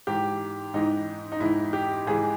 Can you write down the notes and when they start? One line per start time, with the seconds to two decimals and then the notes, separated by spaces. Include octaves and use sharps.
0.07 G#2 E3 G4
0.74 G#2 E3 D#4
1.32 D#4
1.40 G#2 E3 E4
1.73 G4
2.07 G#2 E3 G#4